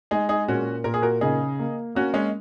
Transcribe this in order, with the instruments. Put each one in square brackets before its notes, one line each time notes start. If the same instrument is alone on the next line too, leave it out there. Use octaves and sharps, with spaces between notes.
[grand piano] G#3 [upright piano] D#4 G#4
[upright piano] D#4 G#4
[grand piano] A#2 [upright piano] C#4 F#4
[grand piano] A#2 [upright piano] A#4
[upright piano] G#4
F#4 A#4
[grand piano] C#3 [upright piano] D#4 G#4
[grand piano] A#3
[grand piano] A#3 [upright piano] C#4 F#4
[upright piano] G#3 C#4